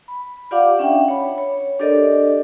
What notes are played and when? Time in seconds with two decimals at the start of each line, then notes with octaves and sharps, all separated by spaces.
0.08 B5
0.51 F4 G4 D5 F5 F#5 D6
0.79 C#4 D4 E5 F#5 G5
1.09 C#5 B5
1.38 C#5
1.80 D4 G4 A4 A#4 D5 D#5